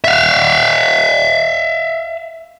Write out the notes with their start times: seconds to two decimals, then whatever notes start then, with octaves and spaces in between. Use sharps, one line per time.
0.04 E5 F5